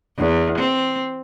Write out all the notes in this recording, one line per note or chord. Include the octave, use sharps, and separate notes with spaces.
E2
C4